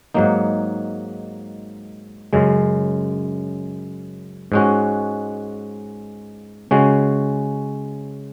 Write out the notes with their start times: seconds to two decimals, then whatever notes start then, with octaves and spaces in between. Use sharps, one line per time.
0.14 G#2 F#3 A#3 D#4
2.33 F#2 C#3 G#3
4.52 G#2 G#3 C#4 F#4
6.71 C#3 G#3 C#4 F#4